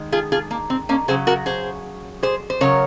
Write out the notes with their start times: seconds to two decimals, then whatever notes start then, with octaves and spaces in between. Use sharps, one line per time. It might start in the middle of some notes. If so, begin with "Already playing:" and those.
Already playing: D#3 G#3
0.12 F4 G#4
0.32 F4 G#4
0.51 A#3
0.70 C4
0.89 A#3 C#4
1.08 C#3 F#3 G#4 C5
1.27 F#4 A#4
1.46 G#4 C5
2.23 G#4 C5
2.50 C5
2.61 C#3 F#3 A#4 C#5